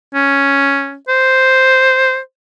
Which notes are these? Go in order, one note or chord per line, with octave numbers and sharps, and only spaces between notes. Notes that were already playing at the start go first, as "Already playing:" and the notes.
C#4
C5